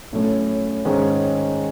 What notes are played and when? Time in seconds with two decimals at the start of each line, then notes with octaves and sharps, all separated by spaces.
0.13 A2 F#3 A3 C#4
0.85 G#2 D#3 G#3 C#4